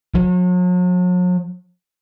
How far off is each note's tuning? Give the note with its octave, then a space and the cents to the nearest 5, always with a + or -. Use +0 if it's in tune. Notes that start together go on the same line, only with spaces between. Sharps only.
F#3 -45